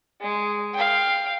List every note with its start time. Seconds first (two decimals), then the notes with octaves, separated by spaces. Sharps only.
0.21 G#3
0.74 F5 G5